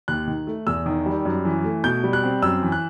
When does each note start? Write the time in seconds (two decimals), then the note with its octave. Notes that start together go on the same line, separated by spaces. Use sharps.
0.08 D#2 F#6
0.28 D#3
0.47 A3
0.67 E2 E6
0.86 D#3
1.06 G3
1.25 F#2
1.45 E3
1.64 A3
1.84 B2 G6
2.04 G3
2.13 F#6
2.23 C4
2.42 F#2 E6
2.62 E3
2.72 F#6